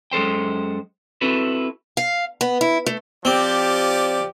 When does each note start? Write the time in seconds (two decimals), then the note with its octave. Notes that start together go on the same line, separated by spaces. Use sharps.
0.11 F#2 G#3 A4 C5 G5
1.21 C4 E4 F#4 A4 B4
1.97 F5
2.41 B3
2.61 E4
2.86 A3
3.25 F3 C4 G4 D5